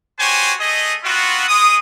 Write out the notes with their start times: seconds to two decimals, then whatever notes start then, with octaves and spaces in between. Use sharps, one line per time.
0.19 F#4 G4 C5 C#5 G#5
0.60 A3 G#4 D#5
1.04 B3 C4 F4 F#4
1.48 G#3 D#6